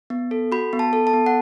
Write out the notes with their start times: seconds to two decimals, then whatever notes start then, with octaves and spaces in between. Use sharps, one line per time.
0.10 B3
0.31 A4
0.52 F#4 B5
0.73 B3
0.79 A5
0.93 A4
1.07 A5
1.13 B3
1.26 F#5